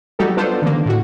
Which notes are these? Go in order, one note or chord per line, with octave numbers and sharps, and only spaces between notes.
F#3 G3 D#4 F#4 G4 A4
B3 D4 F4 A4 C5
D3 D#3 A#3
A2 F#4